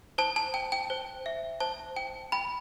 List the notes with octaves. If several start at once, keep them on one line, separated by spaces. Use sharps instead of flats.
C5 A5
A5
G5
G5
C5
E5
C5 A5
G5
G5 B5